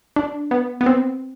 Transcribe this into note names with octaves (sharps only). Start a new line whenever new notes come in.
D4
B3
B3
C4